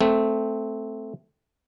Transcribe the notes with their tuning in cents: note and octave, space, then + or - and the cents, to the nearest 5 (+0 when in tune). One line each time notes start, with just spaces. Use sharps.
A3 +0 C4 -10